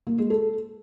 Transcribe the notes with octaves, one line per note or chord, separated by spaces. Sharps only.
A#3
G#3
A4